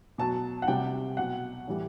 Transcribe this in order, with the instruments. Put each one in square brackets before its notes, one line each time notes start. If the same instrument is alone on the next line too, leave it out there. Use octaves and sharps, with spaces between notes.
[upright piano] B2 F#3 A5
F#5
C3 G3 G5
B2 F#3 F#5
A2 E3 G3